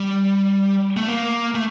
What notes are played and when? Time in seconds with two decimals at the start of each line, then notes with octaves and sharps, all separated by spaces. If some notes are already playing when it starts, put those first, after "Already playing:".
Already playing: G3
0.97 A3
1.08 A#3
1.55 A3